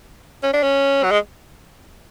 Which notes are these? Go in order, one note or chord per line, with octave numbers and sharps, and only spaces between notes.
C#4
D4
C#4
F#3
G#3